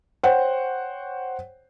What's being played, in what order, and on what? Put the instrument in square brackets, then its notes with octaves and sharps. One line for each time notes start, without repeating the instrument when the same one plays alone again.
[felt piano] C5 C#5 F#5 G5